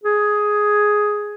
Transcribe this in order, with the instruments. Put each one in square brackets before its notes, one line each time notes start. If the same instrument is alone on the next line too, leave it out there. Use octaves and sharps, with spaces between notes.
[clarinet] G#4